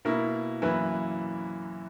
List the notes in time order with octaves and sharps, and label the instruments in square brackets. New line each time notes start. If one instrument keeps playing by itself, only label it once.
[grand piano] B2 A#3 E4 A#4
F#2 E3 A#3 E4 B4